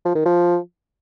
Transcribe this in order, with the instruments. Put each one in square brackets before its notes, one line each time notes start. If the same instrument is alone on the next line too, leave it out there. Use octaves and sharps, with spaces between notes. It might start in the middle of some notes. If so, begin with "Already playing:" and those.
[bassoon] F3
D#3
F3